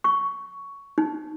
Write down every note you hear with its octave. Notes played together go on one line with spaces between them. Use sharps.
C#6
D#4